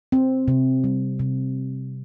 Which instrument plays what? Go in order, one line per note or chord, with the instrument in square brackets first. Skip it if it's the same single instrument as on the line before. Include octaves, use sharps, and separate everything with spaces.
[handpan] C4
C3
G3
C3